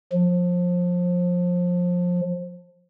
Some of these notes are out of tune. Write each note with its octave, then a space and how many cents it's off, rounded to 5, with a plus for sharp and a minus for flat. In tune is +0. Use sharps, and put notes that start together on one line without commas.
F3 +25